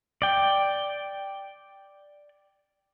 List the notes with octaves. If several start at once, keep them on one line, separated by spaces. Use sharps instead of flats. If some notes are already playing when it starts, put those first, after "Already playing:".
D5 G5